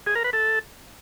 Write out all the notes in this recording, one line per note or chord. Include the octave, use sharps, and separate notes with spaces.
G#4
A#4
B4
A4